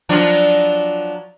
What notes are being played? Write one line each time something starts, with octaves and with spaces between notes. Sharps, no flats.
F3 F#3 D4